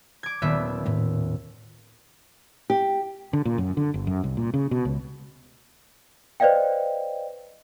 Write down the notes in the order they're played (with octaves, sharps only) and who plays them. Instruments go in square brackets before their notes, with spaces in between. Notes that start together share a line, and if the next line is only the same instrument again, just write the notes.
[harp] D6 G#6
[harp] D#1 B3 E5 [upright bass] F#3
[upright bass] D#2 A2
[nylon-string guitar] G4
[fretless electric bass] D3
A#2
F#2
D3
G1
F#2
C2
A#2
C#3
B2
C#2
[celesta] B4 C5 D5 D#5 F5 G5